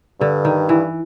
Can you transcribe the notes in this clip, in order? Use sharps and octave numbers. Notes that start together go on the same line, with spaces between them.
G2 D3
D#3
E3